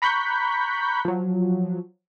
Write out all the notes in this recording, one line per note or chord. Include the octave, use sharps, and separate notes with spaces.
A#5 B5 C#6 F#6 G6 B6
F3 F#3